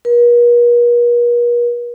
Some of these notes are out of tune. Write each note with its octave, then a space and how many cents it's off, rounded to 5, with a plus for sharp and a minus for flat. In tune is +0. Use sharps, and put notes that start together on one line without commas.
A#4 +45